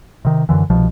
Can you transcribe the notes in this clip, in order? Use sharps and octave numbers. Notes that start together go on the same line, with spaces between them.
C3 D#3
F#2 A2 D3 E3
C2 B2 F3